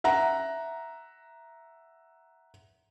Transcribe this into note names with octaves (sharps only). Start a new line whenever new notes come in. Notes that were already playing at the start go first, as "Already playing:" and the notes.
E5 F#5 A#5